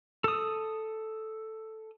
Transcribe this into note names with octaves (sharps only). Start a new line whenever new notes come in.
A4 D#6